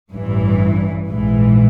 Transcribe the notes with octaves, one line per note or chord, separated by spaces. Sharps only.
A1 G2 E3
A#1 G#2 E3